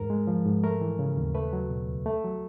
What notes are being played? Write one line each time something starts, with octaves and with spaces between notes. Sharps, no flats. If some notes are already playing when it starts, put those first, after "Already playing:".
Already playing: E2 G#2 A#4
G#3
F3
G#2
A3 A#4
E3
C#3
D#2
A3 B4
F#3
B2
C#2
A3
F#3